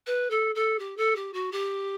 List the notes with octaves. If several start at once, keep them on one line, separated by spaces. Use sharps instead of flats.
B4
A4
A4
G4
A4
G4
F#4
G4